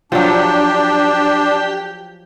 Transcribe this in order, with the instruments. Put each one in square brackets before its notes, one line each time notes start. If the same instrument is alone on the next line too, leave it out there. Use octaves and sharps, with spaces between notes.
[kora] F3 F#3 [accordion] D4 [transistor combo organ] G4